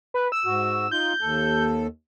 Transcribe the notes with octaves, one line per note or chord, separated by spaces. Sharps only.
B4
E6
G#2 F#4
D#4 F4 G6
D#2 A4